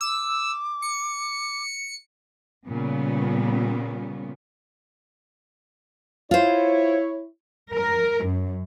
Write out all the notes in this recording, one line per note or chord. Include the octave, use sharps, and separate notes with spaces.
D6 E6
C#7
A#2 C#3 G3 B3 C#4
E4 F4 C5 C#5
A#4
F#2